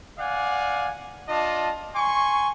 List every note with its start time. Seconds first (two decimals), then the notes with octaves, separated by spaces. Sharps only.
0.18 D5 F5 F#5 G#5
1.28 D4 F4 D#5 A5
1.95 G#5 C6 C#6